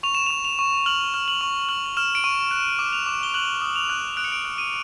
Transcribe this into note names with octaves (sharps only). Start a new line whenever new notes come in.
C#6 F7
E7
C#6 F7
F7
C#6
F6 F#7
F6
F#7
C#6
F6 F#7
F6 E7
D7
C#6 D#7
F#6 E7
D6
F7
D6
G7
F#6 F#7
D#6
F7
F#6
F#6 D7
C#7
D7
F#6
D#7